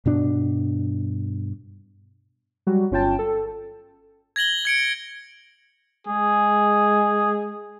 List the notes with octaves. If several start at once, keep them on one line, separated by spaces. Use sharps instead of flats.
G2 B2 D4
F#3 G3 F#4
G1 C#4 F4 G5 A5
A4
G#6 A#6 F#7 G7
G#6 C#7 D7
G#3 G#4